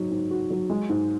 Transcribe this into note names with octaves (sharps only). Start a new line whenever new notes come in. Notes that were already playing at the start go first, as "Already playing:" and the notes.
Already playing: G#2 F#3 D#4
G#2
F#4
F#3
G#3
G#2